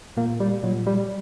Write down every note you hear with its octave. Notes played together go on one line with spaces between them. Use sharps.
A#2 A#3
G3
A#2 F#3
G3